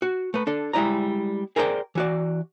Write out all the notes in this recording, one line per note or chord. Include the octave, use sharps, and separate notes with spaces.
F#4
A3 B4
D4 A4
G3 G#3 E4 D5 A#5
G#4 A#4 C5 D5 F5 G5
E3 F#4 D5